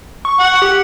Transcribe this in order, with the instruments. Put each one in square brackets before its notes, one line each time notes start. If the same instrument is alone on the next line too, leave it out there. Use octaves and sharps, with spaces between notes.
[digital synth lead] C#6
[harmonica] F#5
[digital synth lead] G4